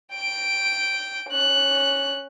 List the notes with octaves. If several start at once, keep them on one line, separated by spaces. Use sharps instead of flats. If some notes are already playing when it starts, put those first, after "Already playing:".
G5 D7
C#4 F#6